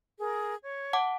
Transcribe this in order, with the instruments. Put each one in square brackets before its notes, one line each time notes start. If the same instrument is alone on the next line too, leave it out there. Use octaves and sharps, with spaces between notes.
[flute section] G#4 A#4
C#5
[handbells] F#5 A5 D6